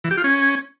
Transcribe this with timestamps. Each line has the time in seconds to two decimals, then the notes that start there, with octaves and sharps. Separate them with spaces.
0.04 E3
0.11 G4
0.17 F4
0.24 C#4